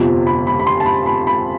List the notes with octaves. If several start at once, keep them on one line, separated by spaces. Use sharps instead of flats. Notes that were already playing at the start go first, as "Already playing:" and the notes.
Already playing: G1 F2 C3 F3
B5
B5
B5
C6
A5
B5
B5
B5